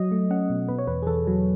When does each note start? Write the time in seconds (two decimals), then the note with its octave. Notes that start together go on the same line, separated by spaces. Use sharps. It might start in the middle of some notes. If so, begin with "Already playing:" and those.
Already playing: F#3 D#5
0.11 A3
0.30 C#4 F#5
0.50 B2
0.68 B2 B4
0.78 C#5
0.87 E2 B4
1.02 G#4
1.07 E2 A4
1.27 F#3